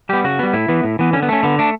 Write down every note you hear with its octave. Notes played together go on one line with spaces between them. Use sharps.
G3 B3 G4
C#3 F#4
G3 B3
A2 E4
E3 B3
A2
E3 B3
D3 C#4
B3
A3 C#4
D3 B3
A3 D4